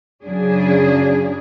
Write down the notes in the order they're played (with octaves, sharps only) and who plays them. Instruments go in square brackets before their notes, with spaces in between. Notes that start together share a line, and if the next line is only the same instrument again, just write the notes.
[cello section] F#2 C#3 F#3 D4 G#4